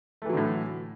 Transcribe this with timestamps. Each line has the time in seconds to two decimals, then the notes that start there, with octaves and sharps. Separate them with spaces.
0.22 A3
0.26 E3
0.29 F#3
0.33 D3
0.37 A2